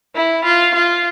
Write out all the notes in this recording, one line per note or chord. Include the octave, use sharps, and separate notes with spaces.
E4
F4
F4